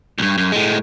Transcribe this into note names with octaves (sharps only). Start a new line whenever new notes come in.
C2 G2
F#2
A2 G#3